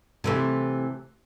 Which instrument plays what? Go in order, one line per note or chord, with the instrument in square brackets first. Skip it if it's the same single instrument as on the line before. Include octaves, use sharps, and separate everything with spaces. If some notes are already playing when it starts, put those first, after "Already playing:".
[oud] C3 E3 A3